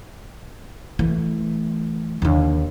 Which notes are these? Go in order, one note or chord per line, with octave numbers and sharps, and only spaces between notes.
E3 A3
D#2 D3